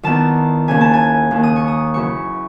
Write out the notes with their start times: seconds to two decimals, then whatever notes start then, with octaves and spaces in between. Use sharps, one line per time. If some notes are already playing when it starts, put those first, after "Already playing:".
0.03 E2 D#3 A5
0.68 D#2 C#3 E3 G#5
0.81 A5
0.94 G#5
1.31 D#2 D#3
1.43 D#6
1.56 C#6
1.68 D#6
1.94 F#2 C#3 E3 C#6